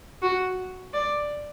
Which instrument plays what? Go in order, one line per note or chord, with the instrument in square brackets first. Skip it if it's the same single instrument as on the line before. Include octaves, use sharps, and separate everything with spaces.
[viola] F#4
D5